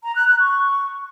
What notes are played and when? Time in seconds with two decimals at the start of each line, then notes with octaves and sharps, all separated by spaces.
0.04 A#5
0.16 F#6
0.28 F#6
0.40 C#6